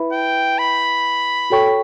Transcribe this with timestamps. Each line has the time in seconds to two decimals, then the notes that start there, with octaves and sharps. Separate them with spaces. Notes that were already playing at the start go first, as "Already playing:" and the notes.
Already playing: E4 B4 E5 B5
0.12 G5
0.59 B5
1.50 F#4 A4 C#5 G5 C#6